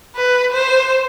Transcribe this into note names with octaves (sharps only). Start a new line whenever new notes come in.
B4
C5